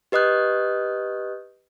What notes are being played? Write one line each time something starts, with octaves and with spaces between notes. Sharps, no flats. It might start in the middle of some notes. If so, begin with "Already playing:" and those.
G4 B4 D#5 D#6 F#6 G6